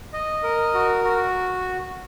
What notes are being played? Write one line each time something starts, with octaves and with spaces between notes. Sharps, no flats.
D#5
A#4
F#4
F#4